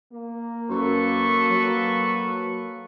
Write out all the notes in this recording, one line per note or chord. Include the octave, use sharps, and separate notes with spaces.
A#3
F#2 A4 B4 C#6
F#3